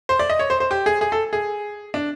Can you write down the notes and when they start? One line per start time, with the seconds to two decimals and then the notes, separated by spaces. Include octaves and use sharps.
0.09 C5
0.19 D5
0.30 D#5
0.39 C#5
0.50 C5
0.60 C5
0.71 G4
0.86 G#4
1.01 G#4
1.12 A4
1.33 G#4
1.94 D4